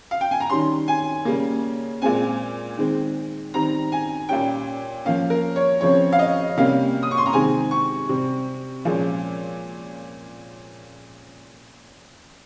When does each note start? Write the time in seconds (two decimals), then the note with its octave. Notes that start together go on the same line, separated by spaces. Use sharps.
0.11 F5
0.21 G5
0.31 G#5
0.40 A#5
0.50 D#3 G3 C#4 C6
0.88 G#5
1.25 C#3 G3 A#3
2.02 A#2 G#3 C4 G#5
2.78 D#3 G#3 C4
3.54 D#3 G3 C4 A#5
3.92 G#5
4.29 A#2 G3 C#4 G5
5.05 F3 A#3 C#4 F5
5.30 A#4
5.56 C#5
5.81 C#3 F3 C4 C#5
6.12 F5
6.19 D#5
6.57 C3 G3 A#3 C#4 F5
7.03 D#6
7.11 C#6
7.18 C6
7.26 A#5
7.33 C3 D#3 G#3 C4 G#5
7.71 C#6
8.09 C3 G3 C4
8.85 A#2 F3 G#3 C#4